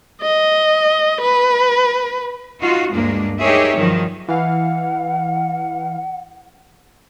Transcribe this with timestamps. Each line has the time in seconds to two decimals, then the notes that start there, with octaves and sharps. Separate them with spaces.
0.22 D#5
1.21 B4
2.61 D#4 F4 F#4
2.94 D2 G2 G#3 A#3 D4
3.42 D#4 G4 G#4 A#4 C#5 E5
3.77 G2 D#3 F3 F#3
4.28 E3 F5 F#5